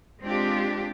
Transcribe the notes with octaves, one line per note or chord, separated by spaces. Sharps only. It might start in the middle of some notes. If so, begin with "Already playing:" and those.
G#3 C4 D4 F4 G4